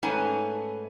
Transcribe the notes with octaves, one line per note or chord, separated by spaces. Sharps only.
G#2 A3 C#4 B4 G#5 A#5